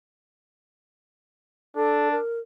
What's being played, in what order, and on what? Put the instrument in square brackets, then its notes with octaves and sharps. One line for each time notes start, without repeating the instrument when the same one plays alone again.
[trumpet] D4 [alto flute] A4
[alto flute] A#4